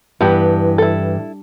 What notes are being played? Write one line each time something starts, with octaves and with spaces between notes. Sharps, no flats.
G2 E3 B3 G4
E4 A4